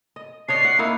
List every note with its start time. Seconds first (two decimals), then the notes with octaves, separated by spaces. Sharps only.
0.16 D#5
0.48 D4 C#5 D#5 C7
0.65 F#5
0.79 A#3 D#4 E4